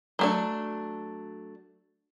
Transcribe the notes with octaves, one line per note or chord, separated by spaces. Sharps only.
F#3 A3 D4